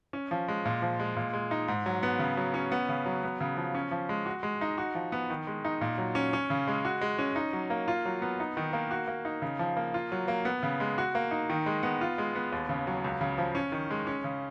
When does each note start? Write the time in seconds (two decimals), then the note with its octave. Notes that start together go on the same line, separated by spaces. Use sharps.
0.13 C#4
0.31 F3
0.48 G#3
0.65 A#2
0.82 F3
1.00 G#3
1.16 A#2
1.33 G#3
1.51 D#4
1.68 G#2
1.86 F#3
2.03 B3
2.19 C#3
2.37 F#3
2.54 C#4
2.72 B3
2.89 C#3
3.06 F#3
3.23 B3
3.41 C#3
3.57 F3
3.75 C#4
3.91 F3
4.09 G#3
4.26 F#4
4.43 G#3
4.61 D#4
4.78 F#4
4.95 F3
5.12 B3
5.30 D#3
5.47 G#3
5.65 D#4
5.81 A#2
5.98 F#3
6.15 C#4
6.33 C#4
6.50 C#3
6.68 G#3
6.85 F#4
7.01 G#3
7.19 C#4
7.36 D#4
7.53 F#3
7.70 A#3
7.88 F4
8.05 F#3
8.22 B3
8.40 D#4
8.57 D#3
8.73 A#3
8.91 F#4
9.08 A#3
9.25 D#4
9.42 C#3
9.59 F3
9.77 A#3
9.94 F4
10.12 F#3
10.28 A#3
10.45 B3
10.63 C#3
10.80 G#3
10.98 F#4
11.15 A#3
11.31 D#4
11.50 D#3
11.66 G#3
11.83 B3
12.01 F4
12.18 G#3
12.35 B3
12.52 D#2
12.69 C#3
12.87 F#3
13.04 C#2
13.21 C#3
13.38 F3
13.55 C#4
13.72 D#3
13.90 G#3
14.07 C#4
14.24 C#3